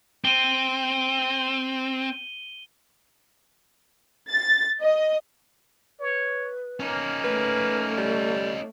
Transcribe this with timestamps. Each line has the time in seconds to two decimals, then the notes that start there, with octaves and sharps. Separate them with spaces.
0.25 C4 D#7 G7
4.29 A6
4.81 D#5
6.00 B4 C#5
6.80 A#3 C#4 D#4
7.25 A3 B4
7.98 G3